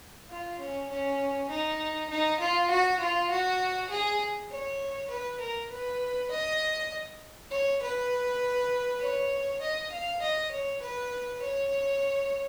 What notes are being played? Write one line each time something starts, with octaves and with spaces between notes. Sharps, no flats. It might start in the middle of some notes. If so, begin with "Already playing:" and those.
F4
C#4
C#4
D#4
D#4
F4
F#4
F4
F#4
G#4
C#5
B4
A#4
B4
D#5
C#5
B4
C#5
D#5
F5
D#5
C#5
B4
C#5